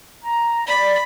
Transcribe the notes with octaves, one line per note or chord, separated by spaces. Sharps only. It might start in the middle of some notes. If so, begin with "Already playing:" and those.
A#5
D5 B5